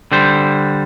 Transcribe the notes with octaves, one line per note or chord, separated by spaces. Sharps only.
D3 G3 C5